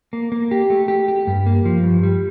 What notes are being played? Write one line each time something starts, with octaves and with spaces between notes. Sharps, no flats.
A#3
A#3
G4
A3
G4
G4
G2
A#3
F3
G2
G3